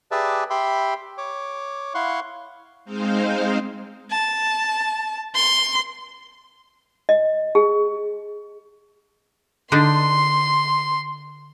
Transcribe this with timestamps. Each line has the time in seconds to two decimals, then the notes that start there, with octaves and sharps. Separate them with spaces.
0.11 G4 G#4 B4 D5 E5 A5
0.50 G4 E5 G5 B5 C6
1.18 C#5 D6
1.94 E4 F5 F#5 C6 C#6
2.85 G#3 C4 D#4 C5 F5
4.11 A5
5.35 C6
7.09 D#5
7.55 G#4
9.72 D3 D4 D#4 C6